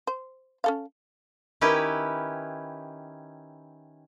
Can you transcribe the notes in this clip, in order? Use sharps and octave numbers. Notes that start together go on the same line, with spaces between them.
C5
C#4 A4 F5
D#3 C#4 E4 G4 B4 E5